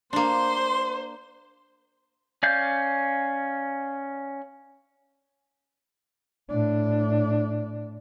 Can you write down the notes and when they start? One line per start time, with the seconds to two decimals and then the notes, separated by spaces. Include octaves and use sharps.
0.13 A#3 D4 C5 C6
2.43 C#4 D5 F5 G6
6.50 A2 D4